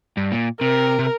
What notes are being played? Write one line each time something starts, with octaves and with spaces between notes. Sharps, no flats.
G2
A#2
C3 A#4
C3